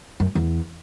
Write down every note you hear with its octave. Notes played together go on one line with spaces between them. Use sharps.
F#2
E2